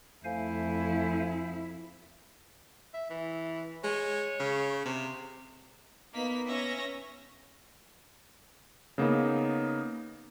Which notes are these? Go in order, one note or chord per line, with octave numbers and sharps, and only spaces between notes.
F2 A3 E4 C5 F5 G#5
E5
E3
G#3 C#5
C#3
C3
A#3 B3 D#4 B6
C#4 E5 A#6
C#3 A#3 B3 D#4